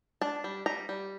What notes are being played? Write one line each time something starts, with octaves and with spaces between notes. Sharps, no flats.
D4 A5
G3
G3 A#5
G3